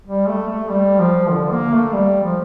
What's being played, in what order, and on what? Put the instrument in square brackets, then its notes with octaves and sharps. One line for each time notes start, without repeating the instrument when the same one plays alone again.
[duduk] G3
A3
A3
G3
F3
D3
A#3
A3
G3
F3